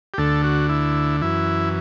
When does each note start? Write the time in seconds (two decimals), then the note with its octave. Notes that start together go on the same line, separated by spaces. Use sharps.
0.14 G4
0.18 D2 D3 A4
0.43 F#4
0.69 E4
1.22 F#2 E3 E4